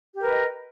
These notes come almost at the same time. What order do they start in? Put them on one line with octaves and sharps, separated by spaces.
G4 A#4 B4 D#5